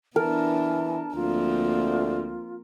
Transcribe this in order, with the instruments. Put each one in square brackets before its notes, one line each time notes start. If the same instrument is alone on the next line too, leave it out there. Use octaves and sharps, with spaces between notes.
[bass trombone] E3 [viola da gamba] B3 D4 [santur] A#4 [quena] A5
[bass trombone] D2 [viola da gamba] F3 A#3 C4 [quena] F4